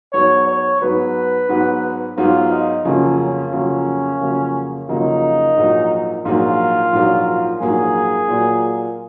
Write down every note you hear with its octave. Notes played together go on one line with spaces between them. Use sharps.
G#2 F#3 B3 C#5
C#5
G#2 F#3 B3 B4
G#2 F#3 B3
G#2 F#3 B3 F4
D#4
F2 C#3 F#3 A#3 C#4
C#4
F2 C#3 F#3 A#3
F2 C#3 F#3 A#3
F2 C#3 F#3 A#3 D#4
A#1 G#2 F#3 A#3
A#1 G#2 F#3 A#3 F4
A#1 G#2 F#3 A#3
A#1 G#2 F#3 A#3 G#4
A#2 F#3 A#3